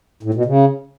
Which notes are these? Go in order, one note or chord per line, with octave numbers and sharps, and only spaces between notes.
A2
B2
C#3